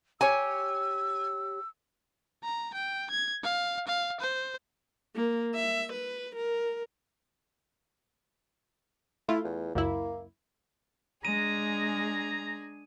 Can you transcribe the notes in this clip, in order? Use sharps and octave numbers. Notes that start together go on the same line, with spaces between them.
G4 C#5 G#5 E6
A#5
G5
G#6
F5
F5
C5
A#3
E5
B4
A#4
A3 E4 F4
E2
C#2 F#2 A#3 E4
G#3 D4 G#4 A#5 D#7